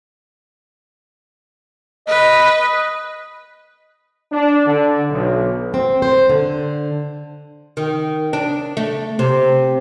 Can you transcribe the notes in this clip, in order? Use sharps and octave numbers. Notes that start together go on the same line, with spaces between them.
B4 D#5
D4
D3
B1
C4
C5
D3
D#3
D4
A3
C3